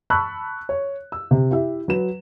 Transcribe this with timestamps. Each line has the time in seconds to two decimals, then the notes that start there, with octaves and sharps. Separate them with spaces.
0.10 A5 B5 C#6 E6 F#6
0.69 C#5
1.12 E6
1.31 C3
1.51 E4 G4 E5
1.88 F#3 B4 E7